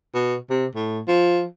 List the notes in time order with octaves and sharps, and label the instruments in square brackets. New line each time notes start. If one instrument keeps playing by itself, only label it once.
[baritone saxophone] B2
C3
A2
F3